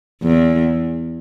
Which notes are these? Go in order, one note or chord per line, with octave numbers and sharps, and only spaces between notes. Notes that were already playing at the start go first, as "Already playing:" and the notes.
E2